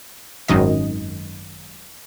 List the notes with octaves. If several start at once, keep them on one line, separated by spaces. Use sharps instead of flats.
G#1 F#2 D#3 D#5